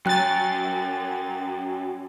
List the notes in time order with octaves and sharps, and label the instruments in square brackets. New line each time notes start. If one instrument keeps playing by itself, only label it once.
[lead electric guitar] F#2 [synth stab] F#3 A6 [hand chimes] G5 F#6